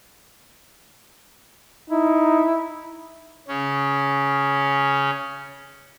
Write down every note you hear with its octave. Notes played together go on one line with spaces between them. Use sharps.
D#4 E4
C#3 C#4